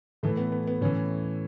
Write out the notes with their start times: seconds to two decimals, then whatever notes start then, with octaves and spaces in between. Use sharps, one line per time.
0.23 A2 E3 A3
0.37 B3
0.52 B3
0.67 B3
0.81 A2 E3 C#4